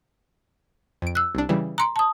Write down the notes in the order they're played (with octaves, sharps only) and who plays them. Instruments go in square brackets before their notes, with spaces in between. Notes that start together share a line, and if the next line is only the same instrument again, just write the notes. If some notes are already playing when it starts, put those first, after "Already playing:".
[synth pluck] F2 D7
[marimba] E6 F#6
[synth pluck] C2 D4
C#3 E3 G3
[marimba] A#5 C6 [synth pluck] F#6 C#7 D7
[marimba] A5 D#6